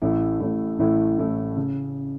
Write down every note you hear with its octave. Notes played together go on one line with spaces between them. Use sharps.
A1 A2 A3 E4
A1 A2 A3 E4
A1 A2 A3 E4
A1 A2 A3 E4
C#3